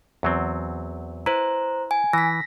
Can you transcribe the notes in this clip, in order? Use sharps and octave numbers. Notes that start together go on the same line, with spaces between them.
E2 F#3 C4
E4 B4 C5 A#5
G#5
E3 A#6 B6